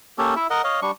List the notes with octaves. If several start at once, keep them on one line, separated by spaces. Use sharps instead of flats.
A#3 C#4 G4 A4
E4 E5
A#4 D#5 F#5
C#5 D#5 F5
G3 D4 C#6